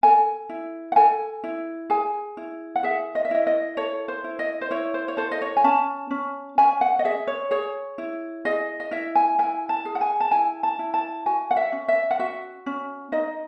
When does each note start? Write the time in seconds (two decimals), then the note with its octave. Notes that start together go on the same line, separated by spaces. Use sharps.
0.03 A4 G#5
0.49 E4
0.92 F#5
0.96 A4 G#5
1.44 E4
1.90 G#4 G#5
2.37 E4
2.76 F#5
2.83 G#4 E5
3.15 D#5
3.25 E5
3.31 E4 D#5
3.47 D#5
3.77 A4 C#5
4.08 C5
4.24 E4
4.39 D#5
4.61 C5
4.71 E4 C#5
4.94 C5
5.08 C#5
5.17 A4 C5
5.31 D#5
5.42 C#5
5.57 G#5
5.64 C#4 A5
6.11 C#4
6.58 C#4 G#5
6.81 F#5
6.99 D#5
7.05 G#4 E5
7.27 C#5
7.51 G#4 C#5
7.98 E4
8.45 G#4 D#5
8.80 D#5
8.91 E4 E5
9.15 G#5
9.39 E4 G#5
9.69 A5
9.85 G#4
9.95 F#5
10.01 G#5
10.20 A5
10.31 E4 G#5
10.63 A5
10.79 E4
10.94 A5
11.26 F#4 G#5
11.51 F#5
11.57 E5
11.72 C#4
11.88 E5
12.11 F#5
12.19 F#4 E5
12.66 C#4
13.12 D#4 D#5